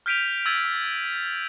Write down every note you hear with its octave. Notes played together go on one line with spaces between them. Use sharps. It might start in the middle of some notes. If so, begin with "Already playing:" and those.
F6 G6 B6 D7 D#7 F7
E6 G#6 A6 D#7